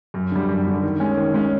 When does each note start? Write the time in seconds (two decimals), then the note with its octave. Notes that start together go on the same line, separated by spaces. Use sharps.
0.14 F#2
0.31 D3 G3
0.48 F#2
0.66 D3 G3
0.83 D#3
1.00 G#3 C#4
1.17 D#3
1.34 G#3 C#4